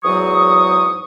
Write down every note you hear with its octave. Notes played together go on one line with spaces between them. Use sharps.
E2 G#2 F#3 F#4 C#6 D#6